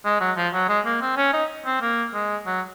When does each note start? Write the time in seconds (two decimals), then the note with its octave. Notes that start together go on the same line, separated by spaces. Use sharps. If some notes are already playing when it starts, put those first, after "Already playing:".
0.05 G#3
0.21 F#3
0.37 F3
0.54 F#3
0.69 G#3
0.86 A#3
1.02 C4
1.17 C#4
1.33 D#4
1.66 C4
1.82 A#3
2.14 G#3
2.46 F#3